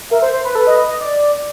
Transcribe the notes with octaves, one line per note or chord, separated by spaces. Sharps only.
A#4 E5
C5
C5
B4
A4 B4
D#5
D#5
D#5
D5